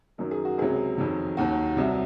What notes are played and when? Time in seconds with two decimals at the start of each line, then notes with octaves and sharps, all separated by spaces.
0.18 F#2 D#3 F#3 A#4
0.31 G#4
0.45 F#4
0.58 C#2 C3 F#3 G#4
0.98 F2 D#3 F#3
1.37 D#2 D#3 F#3 F#4
1.77 C2 C3 F#3